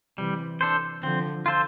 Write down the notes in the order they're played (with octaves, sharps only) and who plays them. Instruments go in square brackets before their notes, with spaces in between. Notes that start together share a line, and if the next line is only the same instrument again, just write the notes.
[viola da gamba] C3 E3 [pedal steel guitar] G3
[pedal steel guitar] D4 A4 C5
[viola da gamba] D3 F3 [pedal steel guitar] C4
[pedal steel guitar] F4 A4 C5